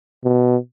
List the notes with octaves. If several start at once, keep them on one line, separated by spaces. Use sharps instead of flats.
B2